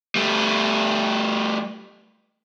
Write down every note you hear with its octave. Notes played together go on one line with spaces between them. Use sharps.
G3 A3